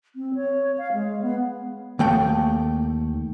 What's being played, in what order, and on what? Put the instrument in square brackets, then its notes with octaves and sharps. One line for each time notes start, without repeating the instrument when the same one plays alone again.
[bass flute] C4
C#5
F5
G#3
B3
[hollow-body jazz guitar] D#2 A3 G5